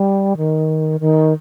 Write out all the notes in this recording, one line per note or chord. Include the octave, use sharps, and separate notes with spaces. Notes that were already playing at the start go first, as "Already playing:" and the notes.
Already playing: G3
D#3
D#3